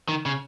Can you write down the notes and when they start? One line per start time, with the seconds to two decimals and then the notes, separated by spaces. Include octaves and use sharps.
0.09 D#3
0.26 C#3